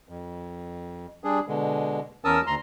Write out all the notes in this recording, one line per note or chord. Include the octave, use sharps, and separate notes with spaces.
F2
G3 D4 G#4
B2 D3 G#3
E2 C#4 A#4 A5 D#6 E6
D2 A#5 C6